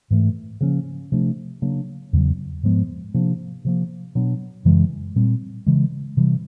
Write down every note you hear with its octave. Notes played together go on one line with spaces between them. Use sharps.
G#2 E3 A3
C#3 F3 A#3 C#4
C3 F3 A3 D4
C#3 F#3 A#3 D4
E2 C#3 F#3
G#2 F3 G#3 B3
C3 F3 A#3 D4
C3 F3 A#3
B2 F#3 B3 D4
F#2 C#3 E3 G#3
A#2 G3 C4
C#3 E3 G#3
C3 E3 G3